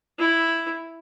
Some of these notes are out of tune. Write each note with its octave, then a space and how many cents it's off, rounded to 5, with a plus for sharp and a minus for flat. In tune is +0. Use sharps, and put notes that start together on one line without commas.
E4 +0